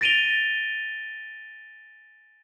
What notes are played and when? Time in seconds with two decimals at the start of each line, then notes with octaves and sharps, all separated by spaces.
0.01 A6 A#6 D7 D#7 F7 G7